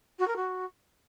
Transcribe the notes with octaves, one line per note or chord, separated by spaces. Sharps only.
F#4
A#4
F#4